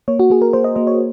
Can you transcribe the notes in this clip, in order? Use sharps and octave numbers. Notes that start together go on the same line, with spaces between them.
A#3 C#5
F#4
A#3 G#4
A#4
A#3 C5
D#5
A#3 D#5
C#5